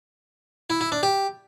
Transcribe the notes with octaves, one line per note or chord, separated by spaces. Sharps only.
E4
E4
D4
G4